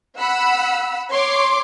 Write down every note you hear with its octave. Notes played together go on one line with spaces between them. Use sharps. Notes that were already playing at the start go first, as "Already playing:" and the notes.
F#5 B5 E6
C#5 C6 D6